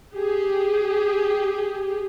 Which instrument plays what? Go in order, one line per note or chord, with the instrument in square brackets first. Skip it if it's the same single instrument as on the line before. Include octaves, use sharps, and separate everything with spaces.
[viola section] G4 G#4